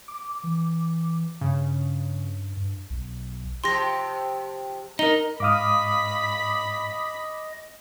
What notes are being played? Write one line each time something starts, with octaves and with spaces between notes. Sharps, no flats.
D6
E3
G2 C#3
G2
B1
C3 F3 G4 C6 A#6
D#4 A#4 G7
G#2 D#5 F5 B5 D6 D#6 F6 B6